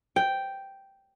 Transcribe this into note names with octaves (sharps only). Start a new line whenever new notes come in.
G5